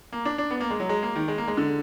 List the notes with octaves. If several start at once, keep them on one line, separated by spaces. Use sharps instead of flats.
A#3
D4
D4
B3
A#3
G#3
F#3
G#3
A#3
D#3
G#3
A#3
G#3
D3